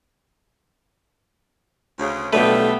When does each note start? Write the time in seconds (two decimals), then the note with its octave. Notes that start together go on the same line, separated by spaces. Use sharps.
1.99 D2 C#3
2.33 B1 A2 D3 G3 A3 B3 B4 G5